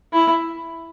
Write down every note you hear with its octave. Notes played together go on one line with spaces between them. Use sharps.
E4